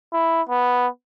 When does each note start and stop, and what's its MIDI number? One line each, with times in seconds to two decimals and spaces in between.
0.13 0.42 64
0.49 0.87 59